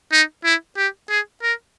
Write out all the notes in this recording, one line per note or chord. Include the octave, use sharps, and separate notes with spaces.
D#4
E4
G4
G#4
A#4